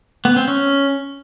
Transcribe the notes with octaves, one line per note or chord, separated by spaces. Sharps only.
B3
C4
C#4